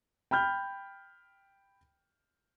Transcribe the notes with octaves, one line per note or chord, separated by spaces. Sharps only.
G5 B5 F6 G6